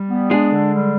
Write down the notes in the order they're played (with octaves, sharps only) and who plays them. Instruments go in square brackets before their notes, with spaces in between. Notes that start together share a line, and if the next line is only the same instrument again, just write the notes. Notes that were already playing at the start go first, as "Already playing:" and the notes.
Already playing: [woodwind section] G3
B3
[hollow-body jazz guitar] G#3 G#4 [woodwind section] D4
[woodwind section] D3
G3